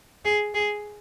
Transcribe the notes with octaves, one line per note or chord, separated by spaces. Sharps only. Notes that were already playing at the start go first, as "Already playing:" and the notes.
G#4
G#4